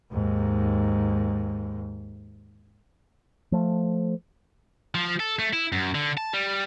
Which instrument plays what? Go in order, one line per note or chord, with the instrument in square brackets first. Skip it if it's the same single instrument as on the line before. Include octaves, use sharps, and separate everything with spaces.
[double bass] D#2 G#2
[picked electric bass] F3 A3
[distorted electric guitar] F3
A4
A3
E4
F#2
D3
A5
G3